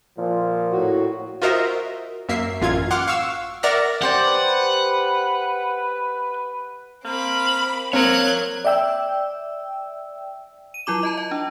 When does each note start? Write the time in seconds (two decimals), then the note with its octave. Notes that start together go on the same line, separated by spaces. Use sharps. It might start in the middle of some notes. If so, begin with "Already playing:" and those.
0.17 A#2 F3
0.71 A2 F#4
1.42 F4 F#4 A#4 C5 D#5 E5
2.29 F#2 A#3 E5 C7
2.61 A1 F#2 F4 G#6
2.91 F#5 C6 D6 F6 F#6
3.07 F5 C#6 E6
3.63 A#4 D5 E5 F#5 F6 A#6
4.02 G4 C5 D5 F#5
4.27 B4
7.05 A#3 C4 B5
7.93 A#3 C4 C#5 F5 A#5 F#6 G#6
8.65 D5 E5 G5 E6
10.74 D#7
10.86 F#3 E4 F4 D6 E7
11.03 D#5 A5 A#5
11.17 D#5
11.31 D4